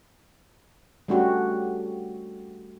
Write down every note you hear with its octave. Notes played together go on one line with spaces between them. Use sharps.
G3 A3 C#4 D4 F#4 G4